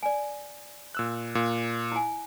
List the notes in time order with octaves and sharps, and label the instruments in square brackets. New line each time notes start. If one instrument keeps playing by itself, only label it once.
[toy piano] D5 G#5
[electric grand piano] A#2 E6 F#6
A#2
[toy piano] E4 G#5